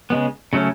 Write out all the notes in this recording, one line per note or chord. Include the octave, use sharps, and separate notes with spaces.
C#3 G#3 B3
C#3 F#3 A3 C#4